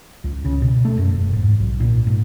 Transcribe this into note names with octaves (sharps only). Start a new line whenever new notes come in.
C#2
C#3
B2
A3
F#2
E1
G#2
B1
A#2
G#2